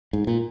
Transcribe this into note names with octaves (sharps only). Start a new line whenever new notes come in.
G#2
A#2